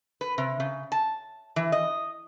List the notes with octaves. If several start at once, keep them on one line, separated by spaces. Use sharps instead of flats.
B4
C3
C#3
A5
E3
D#5